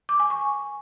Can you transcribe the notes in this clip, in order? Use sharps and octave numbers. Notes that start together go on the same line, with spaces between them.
D6
G#5
C#6